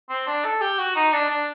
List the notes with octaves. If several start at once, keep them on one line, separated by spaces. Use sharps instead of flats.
C4
D4
A4
G4
F#4
D#4
D4
D4